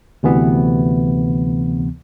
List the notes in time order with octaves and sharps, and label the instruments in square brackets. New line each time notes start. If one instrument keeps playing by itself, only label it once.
[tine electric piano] D2 C3 E3 B3